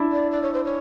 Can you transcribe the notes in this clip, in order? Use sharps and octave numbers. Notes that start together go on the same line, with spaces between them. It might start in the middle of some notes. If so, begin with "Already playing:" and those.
Already playing: D4 E4
D5
D5
C#5
C5
C#5